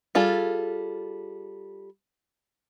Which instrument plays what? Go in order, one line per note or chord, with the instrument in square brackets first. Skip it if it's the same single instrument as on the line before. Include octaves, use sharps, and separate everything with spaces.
[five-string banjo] G3 F4 G#4 A4